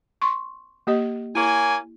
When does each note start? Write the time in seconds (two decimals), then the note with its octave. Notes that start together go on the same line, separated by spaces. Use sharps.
0.22 C6 C#6
0.87 A#3 G4 D#5
1.35 A#3 E4 C#5 G#5